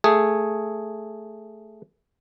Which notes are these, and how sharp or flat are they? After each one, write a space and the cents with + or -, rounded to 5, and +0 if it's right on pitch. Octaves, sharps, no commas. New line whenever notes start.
A3 +0 G#4 +0